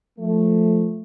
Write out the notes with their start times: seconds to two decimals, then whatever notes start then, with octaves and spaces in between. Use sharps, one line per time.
0.19 F3 A3